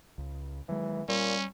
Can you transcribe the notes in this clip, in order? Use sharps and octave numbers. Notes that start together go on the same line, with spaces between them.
C#2
D#3 E3 F#3 G#3
A#2 G3 C#4